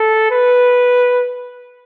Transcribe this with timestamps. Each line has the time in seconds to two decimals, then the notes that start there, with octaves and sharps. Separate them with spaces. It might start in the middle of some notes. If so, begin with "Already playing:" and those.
Already playing: A4
0.30 B4